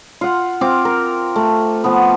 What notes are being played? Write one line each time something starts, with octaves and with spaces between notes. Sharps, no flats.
F4 F#5
C4 F4 D6
A#4
A3
F3 B3